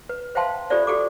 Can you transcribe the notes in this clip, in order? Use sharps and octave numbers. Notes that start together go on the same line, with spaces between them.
B4
C5 E5 F5 G5 A5 C6
F4 G4 A4 C5 D5 E5
F#4 G4 A4 D6